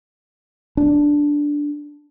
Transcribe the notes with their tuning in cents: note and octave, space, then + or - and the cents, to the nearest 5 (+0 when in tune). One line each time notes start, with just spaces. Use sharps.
D4 -5